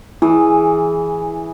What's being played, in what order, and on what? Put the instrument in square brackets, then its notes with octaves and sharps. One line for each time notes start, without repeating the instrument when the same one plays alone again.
[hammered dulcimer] E3 G#4 [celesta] E4